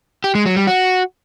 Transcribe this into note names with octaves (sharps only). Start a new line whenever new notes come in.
G4
G#3
F#3
G3
F#4